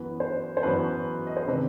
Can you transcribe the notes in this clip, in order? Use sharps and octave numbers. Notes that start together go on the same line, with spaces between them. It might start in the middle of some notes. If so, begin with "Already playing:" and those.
Already playing: F#2 E3 B3 B4
C5
C5
F#2 E3 B3 B4
D#5
C5
C3 D#3 B4